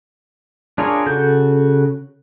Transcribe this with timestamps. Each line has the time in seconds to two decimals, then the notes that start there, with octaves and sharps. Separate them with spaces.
0.78 D4 F4 G#4 A#4 C#5
1.06 C#3 F#4 A4 G6